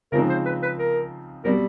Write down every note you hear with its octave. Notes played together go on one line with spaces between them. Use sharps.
C#3 F3 G#3 C4 D#4 A#4
C5
B4
B4
A#4
B2 G3 C4 A#4